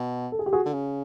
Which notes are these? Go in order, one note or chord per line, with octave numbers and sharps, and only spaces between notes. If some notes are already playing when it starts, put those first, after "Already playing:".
Already playing: B2
A4
G#4
G4
F#4 G#4
D3
C#3